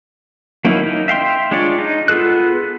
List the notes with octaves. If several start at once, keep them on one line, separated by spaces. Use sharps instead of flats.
F#3 A#3 C#4 D#4 E4
D#4
E5 F5 G5 C6
G#3 D4 F4 C#5 D5
D#4
B3 F4 G#4 A4 F#6